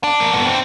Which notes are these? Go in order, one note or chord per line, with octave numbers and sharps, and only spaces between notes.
D4
A#3
B3
C4